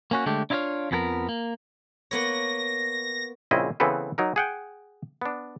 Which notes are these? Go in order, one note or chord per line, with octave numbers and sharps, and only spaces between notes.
A#3 C#4 F#4
D3 G#3 A3 D4 G4
D4 E4 F4 C5 C#5 F5
F2 F3 B3 G4 A#4
A#3
A#3 B3 C#5 A#6
A#1 C#3 C4 C#4 E4 D#5
C#3 E3 B3 C4 A4 B4
F#3 D#4 A#4
G#4 F#5 G5
B3 D4